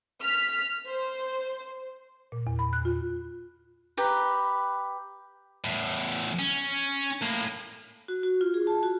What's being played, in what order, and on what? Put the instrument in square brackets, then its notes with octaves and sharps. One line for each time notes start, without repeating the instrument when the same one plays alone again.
[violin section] F6 B6
C5
[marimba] A#2
E2
B5
F#6
F4
[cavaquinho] G4 B4 A#5
[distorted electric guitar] E2 A2
C#4
A2 A#3
[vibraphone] F#4
F#4
F4
G#4
A5
F#4